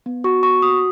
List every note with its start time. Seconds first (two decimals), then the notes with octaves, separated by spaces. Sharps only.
0.06 B3
0.24 F#4 C#6
0.43 B3 C#6
0.62 F#4 D#6